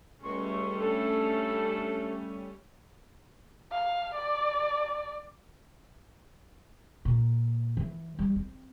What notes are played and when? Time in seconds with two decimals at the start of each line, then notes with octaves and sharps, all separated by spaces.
0.23 C#2 G3 A3 C#4 C6 C#6
0.80 D4 A4
3.71 F5
4.14 D5
7.05 A#2
7.77 E3
8.19 G3
8.36 C4